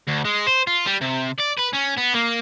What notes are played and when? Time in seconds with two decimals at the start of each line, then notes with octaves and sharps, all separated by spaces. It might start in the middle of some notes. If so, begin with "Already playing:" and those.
0.07 D2
0.25 G#3
0.47 C5
0.67 F4
0.86 G3
1.01 C3
1.38 D5
1.57 B4
1.73 C#4
1.97 B3
2.14 A#3